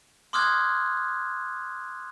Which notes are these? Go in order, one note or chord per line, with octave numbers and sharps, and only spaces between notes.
C6 D6 D#6 F6 F#6 G#6